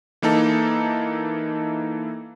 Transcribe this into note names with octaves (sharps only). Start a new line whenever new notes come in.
E3 A#3 D#4 A4